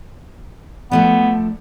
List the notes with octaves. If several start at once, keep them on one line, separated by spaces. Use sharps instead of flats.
F3 A3 B3 D4